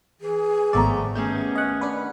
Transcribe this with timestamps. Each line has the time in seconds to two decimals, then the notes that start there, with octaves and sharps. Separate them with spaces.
0.21 E3 G#4
0.73 G#1 F3 A3 B3 A4 D5 A#5
1.15 D#2 A3 B3 C#4 G#4 G6
1.55 D#5 F#5
1.81 D4 B4 F#5